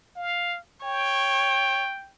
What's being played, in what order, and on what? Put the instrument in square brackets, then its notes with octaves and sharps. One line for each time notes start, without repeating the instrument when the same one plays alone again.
[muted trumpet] F5
[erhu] C#5 [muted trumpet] G5